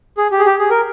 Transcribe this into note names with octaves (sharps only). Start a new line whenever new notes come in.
G#4
G4
G#4
G4
G#4
A#4